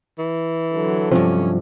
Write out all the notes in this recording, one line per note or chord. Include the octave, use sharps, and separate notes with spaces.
E3
D3 F#3
G2 C3 F3 C#4